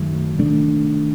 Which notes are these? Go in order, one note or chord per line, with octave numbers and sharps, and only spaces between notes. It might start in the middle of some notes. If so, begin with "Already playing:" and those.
Already playing: F#2 D#3 F#3 A3
C3 D#3 A3 D4